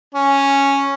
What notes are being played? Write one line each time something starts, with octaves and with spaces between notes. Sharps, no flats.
C#4